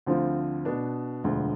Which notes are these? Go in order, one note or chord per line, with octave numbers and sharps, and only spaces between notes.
D2 D3 F3 C4 F4
B2 B3 D4
E1 D2 D3 F3